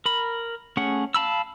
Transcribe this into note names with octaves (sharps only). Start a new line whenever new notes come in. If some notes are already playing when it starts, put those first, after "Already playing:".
A#4 B5
A3 C#4 G#4 F#5
F5 A5 B5 E6